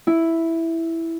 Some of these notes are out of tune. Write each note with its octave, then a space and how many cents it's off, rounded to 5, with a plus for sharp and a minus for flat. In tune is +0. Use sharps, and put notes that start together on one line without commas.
E4 +0